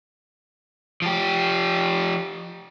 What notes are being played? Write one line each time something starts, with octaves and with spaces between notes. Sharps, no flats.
F3 G4